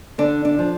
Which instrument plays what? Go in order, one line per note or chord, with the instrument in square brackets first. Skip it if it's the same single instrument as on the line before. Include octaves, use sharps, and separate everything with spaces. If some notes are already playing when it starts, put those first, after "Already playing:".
[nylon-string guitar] D3 D4
D4
F3